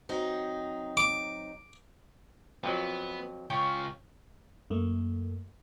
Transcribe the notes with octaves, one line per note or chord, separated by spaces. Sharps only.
F#3 C4 D#4
D6
F2 F3 F#3 B3
C#2 C#4 F4 G5
F#2 A3 A#3